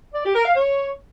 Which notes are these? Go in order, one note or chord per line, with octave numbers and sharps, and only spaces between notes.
D5
G4
A#4
F5
C#5